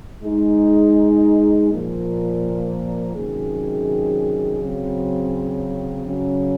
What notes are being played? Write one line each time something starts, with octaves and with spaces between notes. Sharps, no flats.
G#3 D#4 G#4
A#2 F3 A#3
C3 D#3 F#3 C#4 G#4
C#3 F#3 C4
C#3 F#3 C#4